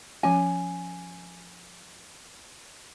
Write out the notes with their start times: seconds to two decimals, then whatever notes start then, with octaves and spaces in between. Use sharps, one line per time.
0.23 F3 C#4 G#5